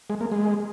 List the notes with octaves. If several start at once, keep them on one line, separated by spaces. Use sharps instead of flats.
G#3
A#3
G#3